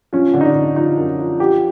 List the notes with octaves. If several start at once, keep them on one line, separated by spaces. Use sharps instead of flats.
F3 C#4
D3
D#4
D4
D3
F3 D#4
F#2
F3
F3 G4